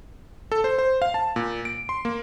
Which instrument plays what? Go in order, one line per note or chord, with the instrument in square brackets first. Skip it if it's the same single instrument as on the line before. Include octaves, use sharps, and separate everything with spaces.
[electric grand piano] A4
C5
C5
F5
A5
A#2
D7
C6
A#3